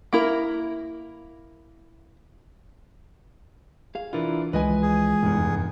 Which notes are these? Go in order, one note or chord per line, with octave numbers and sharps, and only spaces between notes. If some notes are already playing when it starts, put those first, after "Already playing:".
A#3 E4 A#4
G#4 F5
E3 D4 E4 F4 A#4
C#2 E3 F3 G#3 B4 D#5 G#5
G#4
F1 E2 G2